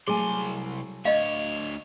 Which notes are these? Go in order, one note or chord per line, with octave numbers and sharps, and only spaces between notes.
C2 F#3 A3 G#4 G#5 C6
D2 C#5 D#5 F5